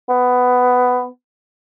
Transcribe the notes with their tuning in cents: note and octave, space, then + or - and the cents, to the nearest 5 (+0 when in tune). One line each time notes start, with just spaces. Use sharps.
B3 +10